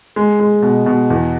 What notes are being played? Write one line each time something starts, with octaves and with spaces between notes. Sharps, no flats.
G#3
G#3
B2
B2
E2